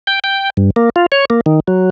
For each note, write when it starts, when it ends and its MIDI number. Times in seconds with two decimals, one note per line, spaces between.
0.07 0.19 79
0.24 0.50 79
0.57 0.70 43
0.76 0.90 58
0.96 1.06 65
1.12 1.25 73
1.30 1.41 58
1.46 1.60 51
1.68 1.90 54